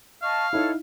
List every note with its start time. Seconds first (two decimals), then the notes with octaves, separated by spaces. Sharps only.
0.22 D#5 F5 A5 C#6
0.53 D#4 E4 A4 C#5